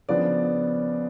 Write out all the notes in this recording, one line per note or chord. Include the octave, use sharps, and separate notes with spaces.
C#3 F3 B3 D4 D5